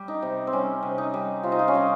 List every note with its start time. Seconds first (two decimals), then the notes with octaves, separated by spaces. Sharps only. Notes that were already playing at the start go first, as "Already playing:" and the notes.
Already playing: G3 G4
0.08 D#4
0.22 C3
0.47 C4
0.53 G3 C#4
0.83 C3
0.98 D#4
1.14 G3
1.43 C3 F4
1.52 D#4
1.59 F4
1.68 C#4
1.73 G3 D#4